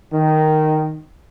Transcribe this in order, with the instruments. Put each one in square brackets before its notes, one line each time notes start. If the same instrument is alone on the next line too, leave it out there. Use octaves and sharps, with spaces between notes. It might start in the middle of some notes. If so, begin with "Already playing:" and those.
[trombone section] D#3